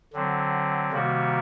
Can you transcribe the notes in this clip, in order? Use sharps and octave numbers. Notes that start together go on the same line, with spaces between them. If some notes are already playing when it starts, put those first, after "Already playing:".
D3 F#3 C4
C3 D#3 G3 A#3 F#4